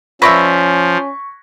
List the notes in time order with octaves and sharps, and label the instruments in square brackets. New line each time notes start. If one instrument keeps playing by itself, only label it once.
[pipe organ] F3 [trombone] C#4 [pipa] B4 D5 E5 [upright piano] C#6 A#6 B6